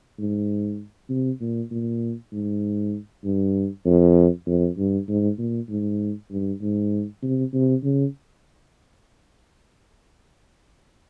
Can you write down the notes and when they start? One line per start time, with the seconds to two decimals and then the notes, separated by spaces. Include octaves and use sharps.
0.19 G#2
1.09 C3
1.41 A#2
1.71 A#2
2.32 G#2
3.24 G2
3.86 F2
4.47 F2
4.78 G2
5.08 G#2
5.38 A#2
5.69 G#2
6.31 G2
6.62 G#2
7.23 C3
7.54 C3
7.84 C#3